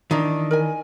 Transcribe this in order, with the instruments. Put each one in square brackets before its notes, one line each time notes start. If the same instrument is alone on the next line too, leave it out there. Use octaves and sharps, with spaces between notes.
[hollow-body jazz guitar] D#3 E3 D4
[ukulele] A#4 D#5 G#5